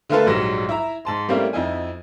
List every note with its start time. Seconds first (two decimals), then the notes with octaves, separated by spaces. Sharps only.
0.09 D3 A3 A#3 F4 A4 B4
0.26 A#1 G#2 F#3 G3 A#6 E7
0.69 E4 E5 A#5
1.05 G#2 A5 C6
1.29 G3 A3 A#3 C4 C#4 E4
1.53 F2 D#4 E4 G#5